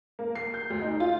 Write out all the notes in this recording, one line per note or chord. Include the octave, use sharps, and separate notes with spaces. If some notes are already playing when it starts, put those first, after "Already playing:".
A#3
C7
G6
D2
D#4
F4